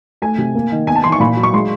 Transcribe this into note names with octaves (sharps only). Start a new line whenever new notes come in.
A3 G#5
C3
A#3
D#3
B3 G#5
A5
E3 C6
C#6
A#2 B5
F#3
C#6
G#3 C6